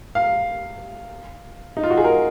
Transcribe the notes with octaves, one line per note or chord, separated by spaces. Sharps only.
F5
D#4
F4
F#4
G#4
A#4